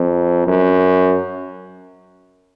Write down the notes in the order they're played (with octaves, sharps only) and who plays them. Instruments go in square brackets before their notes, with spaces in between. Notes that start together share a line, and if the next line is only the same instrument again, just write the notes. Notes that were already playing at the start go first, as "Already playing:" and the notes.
Already playing: [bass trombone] F2
F#2